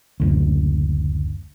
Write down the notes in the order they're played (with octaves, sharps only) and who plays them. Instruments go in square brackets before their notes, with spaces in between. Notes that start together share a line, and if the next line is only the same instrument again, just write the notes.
[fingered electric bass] F#1 D2